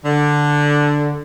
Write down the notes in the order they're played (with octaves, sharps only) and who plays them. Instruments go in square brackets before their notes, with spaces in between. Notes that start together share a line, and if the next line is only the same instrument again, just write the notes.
[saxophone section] D3